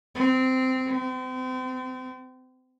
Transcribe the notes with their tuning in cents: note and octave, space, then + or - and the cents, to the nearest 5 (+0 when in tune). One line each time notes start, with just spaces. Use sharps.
C4 -15
C4 -35